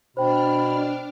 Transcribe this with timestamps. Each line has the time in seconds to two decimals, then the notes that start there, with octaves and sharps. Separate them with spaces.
0.17 B2 D4 C5 D5 G5 B5 F6